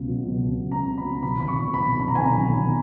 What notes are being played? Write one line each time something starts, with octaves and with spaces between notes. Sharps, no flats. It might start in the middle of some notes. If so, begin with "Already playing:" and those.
Already playing: C#2 B2
F#3
B2
C#2
C#2
A#5
C#2
B5
F#3
B1 B5
B1 B5
C#6
A#2
B5
B1
B1 B5
A#5
B1 G#5
A#5
B1
B1